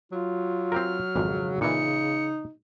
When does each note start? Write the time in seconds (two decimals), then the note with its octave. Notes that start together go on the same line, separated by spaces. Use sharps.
0.12 F#3 F4
0.72 C4 G4 A#4 F6
1.16 G#1 F2 G#2 C#3
1.61 A#2 E3 D#4 C#7